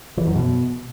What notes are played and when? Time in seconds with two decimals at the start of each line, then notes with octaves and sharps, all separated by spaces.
0.17 E3
0.27 F#2
0.36 B2